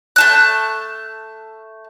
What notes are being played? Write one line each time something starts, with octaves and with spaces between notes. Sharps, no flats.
A3 A5 F#6